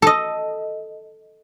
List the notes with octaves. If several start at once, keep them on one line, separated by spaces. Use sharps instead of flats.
A4 D#5